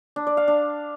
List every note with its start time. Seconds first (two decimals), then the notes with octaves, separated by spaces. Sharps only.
0.16 D4
0.27 D5
0.37 F5
0.48 D4